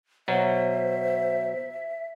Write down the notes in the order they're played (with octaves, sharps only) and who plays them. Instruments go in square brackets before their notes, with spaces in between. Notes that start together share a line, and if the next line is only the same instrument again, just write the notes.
[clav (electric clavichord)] B2 F#3 [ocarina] C5 [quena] E5